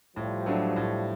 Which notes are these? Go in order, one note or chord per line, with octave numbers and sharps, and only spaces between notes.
A2 F3 G3
F#3 A3 D4
A2